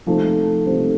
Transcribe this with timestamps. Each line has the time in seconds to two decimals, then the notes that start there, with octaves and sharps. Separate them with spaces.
0.06 C3 F3 A3 C4 D#4
0.66 C3 F3 A3 C4 D#4